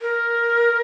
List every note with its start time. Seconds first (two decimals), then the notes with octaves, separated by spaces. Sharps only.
0.02 A#4